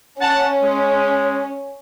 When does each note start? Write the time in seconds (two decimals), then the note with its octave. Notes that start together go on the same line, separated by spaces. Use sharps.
0.20 C#4 F#5 A5
0.62 G#3